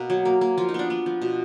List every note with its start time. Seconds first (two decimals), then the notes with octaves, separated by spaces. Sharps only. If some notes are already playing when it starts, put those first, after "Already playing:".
Already playing: B2 A#3 B4
0.10 F#3
0.25 A#3
0.41 A#3
0.58 F3 F4
0.69 D#4
0.74 B3 D4
0.90 B3
1.06 F3
1.22 B2